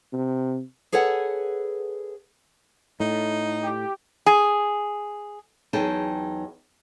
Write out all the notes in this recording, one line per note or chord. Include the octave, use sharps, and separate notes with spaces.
C3
G#4 A4 B4 C#5 F#5
A2 D#4
G4
G#4
E2 F#3 D#4 G#4 G5 A5